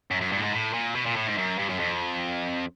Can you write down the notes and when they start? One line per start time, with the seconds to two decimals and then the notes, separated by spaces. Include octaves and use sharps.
0.11 F#2
0.21 F#2
0.32 G2
0.38 A2
0.42 G#2
0.52 A2
0.74 A#2
0.95 B2
1.06 A#2
1.16 A2
1.27 G#2
1.38 F#2
1.58 G2
1.69 F#2
1.79 F2